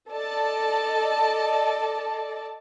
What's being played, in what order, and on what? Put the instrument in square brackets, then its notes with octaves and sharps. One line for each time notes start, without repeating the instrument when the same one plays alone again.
[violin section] A4 D5 D#5 A5